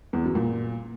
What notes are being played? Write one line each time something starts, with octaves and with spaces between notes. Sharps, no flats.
E2
F#2
A#2